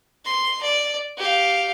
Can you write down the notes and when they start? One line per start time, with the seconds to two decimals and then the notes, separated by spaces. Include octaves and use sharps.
0.25 C6
0.63 D5
1.17 G4 F5